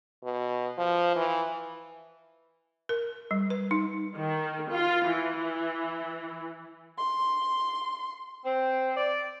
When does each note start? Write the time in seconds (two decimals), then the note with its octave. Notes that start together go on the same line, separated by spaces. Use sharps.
0.24 B2
0.78 F3
1.15 E3
2.89 A#4
3.31 G3
3.50 B4
3.71 D#4
4.16 D#3
4.70 F4
5.08 E3
6.98 C6
8.45 C4
8.96 D5